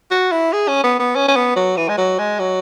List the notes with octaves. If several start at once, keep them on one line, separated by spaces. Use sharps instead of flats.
F#4
E4
G#4
C#4
B3
B3
C#4
C#4
B3
F#3
E3
G#3
F#3
G#3
F#3